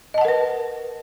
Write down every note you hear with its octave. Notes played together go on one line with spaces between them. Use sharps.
A#4 B4 D#5 F#5 A5